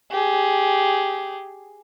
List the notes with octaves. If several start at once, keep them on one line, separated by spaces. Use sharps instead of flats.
G4 G#4